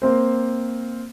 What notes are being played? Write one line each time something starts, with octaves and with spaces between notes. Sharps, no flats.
A#3 C4 C5